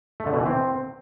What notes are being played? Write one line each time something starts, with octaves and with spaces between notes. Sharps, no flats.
A3
D3
B2
E3
C4